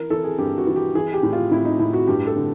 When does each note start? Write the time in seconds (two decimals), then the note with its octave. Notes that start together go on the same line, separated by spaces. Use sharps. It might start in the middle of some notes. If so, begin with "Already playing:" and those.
Already playing: E3 A#4
0.10 E3 A4
0.24 G#4
0.38 G2 G4
0.58 F#4
0.67 E3
0.76 G4
0.95 E3 G#4
1.13 G4
1.23 A2
1.33 F4
1.51 A2 E4
1.65 D#4
1.79 A2 E4
1.93 F#4
2.07 G2 G4
2.27 A4
2.36 D3